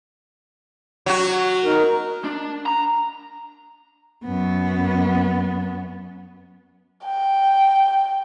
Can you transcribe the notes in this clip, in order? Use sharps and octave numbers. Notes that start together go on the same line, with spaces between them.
F#3 F#4
D#4 A#4
D4
A#5
F#2 B3
G5